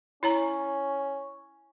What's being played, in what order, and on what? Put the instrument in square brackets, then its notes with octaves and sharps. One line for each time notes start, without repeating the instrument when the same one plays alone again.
[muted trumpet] C#4 [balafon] E4 C#5 A#5